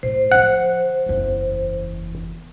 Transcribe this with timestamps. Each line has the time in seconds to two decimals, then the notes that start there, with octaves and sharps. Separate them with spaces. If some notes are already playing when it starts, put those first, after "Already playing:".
0.03 A2 C5
0.32 D3 F3 F#5
1.06 F#1 E2